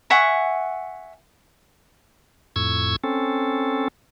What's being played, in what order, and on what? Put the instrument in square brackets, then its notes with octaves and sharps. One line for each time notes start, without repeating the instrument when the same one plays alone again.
[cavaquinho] E5 F#5 G#5 C#6
[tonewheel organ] F2 A2 C#6 E6 G#6
C4 C#4 A4